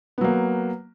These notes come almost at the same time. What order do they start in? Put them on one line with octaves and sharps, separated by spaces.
B3 F#3 A#3